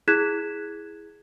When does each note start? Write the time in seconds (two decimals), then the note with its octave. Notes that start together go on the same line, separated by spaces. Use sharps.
0.08 E4 G#4 F#6 G#6 B6 E7